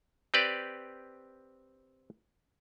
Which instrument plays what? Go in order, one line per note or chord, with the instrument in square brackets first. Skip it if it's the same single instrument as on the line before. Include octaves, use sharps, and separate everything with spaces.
[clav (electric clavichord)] C4 G4 B4 D5